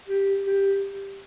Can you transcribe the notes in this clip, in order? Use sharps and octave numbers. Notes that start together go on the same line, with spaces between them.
G4
G4